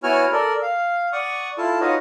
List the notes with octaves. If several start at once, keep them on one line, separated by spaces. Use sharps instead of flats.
B3 E4 F#4 C#5 G#5 F6
A4 A#4 D5
F5
D5 F#5 C#6 D#6
E4 F4 A4 A5
D#4 F4 F#4 B4 C#5 D#5